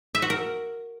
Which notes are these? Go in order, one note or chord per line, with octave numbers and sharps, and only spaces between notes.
E5
F#4
A#4